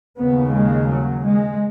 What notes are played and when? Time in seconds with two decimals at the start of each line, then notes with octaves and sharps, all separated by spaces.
0.19 D#2 C#3 B3
0.54 G#3
0.90 F#3
1.25 G#3